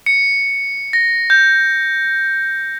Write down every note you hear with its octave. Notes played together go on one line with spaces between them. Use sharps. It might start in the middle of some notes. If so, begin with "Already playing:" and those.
C#7
A#6
G6